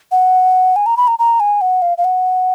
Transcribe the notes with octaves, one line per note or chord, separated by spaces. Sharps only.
F#5
G#5
A#5
B5
A#5
A#5
G#5
F#5
F5
F5
F#5